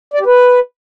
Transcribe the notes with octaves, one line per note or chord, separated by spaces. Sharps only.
D5
G4
B4